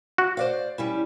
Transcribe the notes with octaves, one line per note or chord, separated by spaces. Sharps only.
F#4
C5 D5 F5
G3 C#4 E4